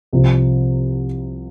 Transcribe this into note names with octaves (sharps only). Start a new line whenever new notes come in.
C2 C3 F3